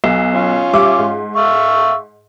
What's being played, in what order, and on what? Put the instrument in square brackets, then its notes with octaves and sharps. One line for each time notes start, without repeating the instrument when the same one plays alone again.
[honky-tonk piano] B1
[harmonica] C#4 F4
[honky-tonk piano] G3 E5 D6
G#2
[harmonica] E5 F5 C#6